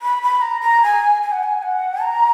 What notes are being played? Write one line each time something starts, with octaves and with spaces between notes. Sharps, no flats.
B5
B5
A#5
A#5
G#5
G#5
F#5
G#5
F#5
A#5